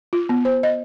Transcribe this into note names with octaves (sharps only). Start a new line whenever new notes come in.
F4
B3
C5
D#5